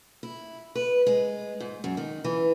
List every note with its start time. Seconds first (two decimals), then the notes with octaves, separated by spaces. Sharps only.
0.23 E4
0.75 B4
1.07 G#3
1.60 G#2
1.84 F#2
1.97 D#3
2.24 E3